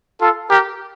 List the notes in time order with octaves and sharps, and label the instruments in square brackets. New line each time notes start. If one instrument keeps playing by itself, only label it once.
[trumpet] F4 [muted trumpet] A4
[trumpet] G4 [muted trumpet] A#4